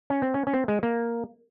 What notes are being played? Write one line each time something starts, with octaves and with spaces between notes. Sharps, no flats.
C#4
C4
C#4
C#4
C4
G#3
A#3